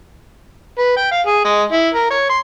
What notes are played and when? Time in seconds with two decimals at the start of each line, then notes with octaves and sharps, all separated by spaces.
0.78 B4
0.97 G5
1.12 F5
1.27 G#4
1.45 G#3
1.72 E4
1.94 A#4
2.11 C#5
2.29 C6